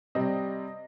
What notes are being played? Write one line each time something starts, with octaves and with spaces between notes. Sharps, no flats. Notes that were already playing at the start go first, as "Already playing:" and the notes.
C3 G3 C4 D#5